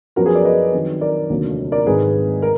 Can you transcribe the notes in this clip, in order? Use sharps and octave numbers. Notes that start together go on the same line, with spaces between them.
F#2 F3 B3 F#4 A#4
G#4 B4
A#4 D5
B4 D#5
F2 D#3 F#3
A#4 D5
F1 D#2 D3 F#3 A#3
A#4 D5
G#1 G#2 D#3 G#4 B4
A#4